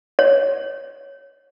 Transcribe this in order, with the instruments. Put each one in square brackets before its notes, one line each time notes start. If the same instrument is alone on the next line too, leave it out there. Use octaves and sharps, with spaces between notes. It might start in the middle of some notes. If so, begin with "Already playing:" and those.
[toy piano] C#5